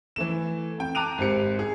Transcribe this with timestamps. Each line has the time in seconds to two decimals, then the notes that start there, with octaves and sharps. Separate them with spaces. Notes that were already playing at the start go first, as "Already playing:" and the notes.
0.16 E3 A3 E7
0.78 F2 G5
0.95 A5 A#5 D6 F#6 D#7 F7
1.18 G#1 C4 G4 C#7
1.59 G#4